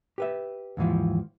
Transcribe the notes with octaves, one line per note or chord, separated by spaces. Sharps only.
G4 B4 E5
D#2 G#2 E3 F3